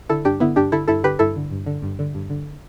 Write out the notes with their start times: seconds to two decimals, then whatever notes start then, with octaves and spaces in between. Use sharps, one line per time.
0.09 D3 E4 A4
0.25 G2 D4 G4
0.40 D3 B3 E4
0.56 G2 D4 G4
0.72 D3 E4 A4
0.88 G2 E4 A4
1.03 D3 G4 B4
1.19 G2 E4 A4
1.36 D3
1.51 G2
1.66 D3
1.82 G2
1.99 D3
2.15 G2
2.30 D3